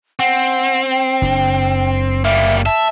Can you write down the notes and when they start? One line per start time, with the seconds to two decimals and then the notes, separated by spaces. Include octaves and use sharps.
0.20 C4 F#5
0.91 G5
1.22 F#1 D4
2.25 G3 A#3 E5
2.66 E5 A5